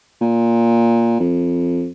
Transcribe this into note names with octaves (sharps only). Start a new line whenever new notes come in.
A#2
F2